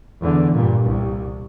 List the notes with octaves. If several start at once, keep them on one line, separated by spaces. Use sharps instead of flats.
E2 D3
G2 A#2
C2